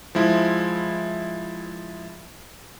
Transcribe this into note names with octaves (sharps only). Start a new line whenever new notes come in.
F3 G#3 E4